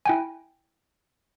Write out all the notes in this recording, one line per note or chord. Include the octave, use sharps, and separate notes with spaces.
E4 G5 G#5